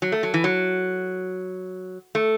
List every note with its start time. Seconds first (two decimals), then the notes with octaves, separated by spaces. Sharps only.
0.02 F#3
0.12 A3
0.23 F#3
0.34 E3
0.44 F#3
2.15 A3